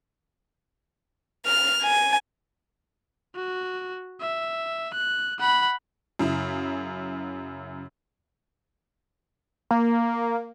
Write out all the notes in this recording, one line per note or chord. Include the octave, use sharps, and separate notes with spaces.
F6
G#5
F#4
E5
F#6
F#5 B5
F#2 C#3 E4
A#3